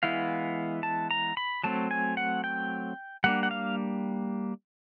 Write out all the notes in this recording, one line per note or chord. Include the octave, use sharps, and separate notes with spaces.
E3 G#3 B3 E4 F5
A5
A#5
B5
F#3 A3 C4 A5
G#5
F#5
G5
G3 A#3 D4 F#5
F#5
F5